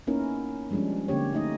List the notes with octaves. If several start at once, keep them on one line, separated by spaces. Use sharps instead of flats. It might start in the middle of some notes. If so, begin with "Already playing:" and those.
A#3 B3 C#4 D#4 E4 A#4
F3 G3 G#3 C#4 D4
D3 A#3 C4 C#4 G4 C#5
A3 D#4 D#5